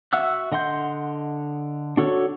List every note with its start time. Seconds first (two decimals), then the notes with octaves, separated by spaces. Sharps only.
0.13 F#4 E5 F#5 E6 F#6
0.52 D3 D#5 F#5 C6 G6
1.97 D4 F#4 A4 C#5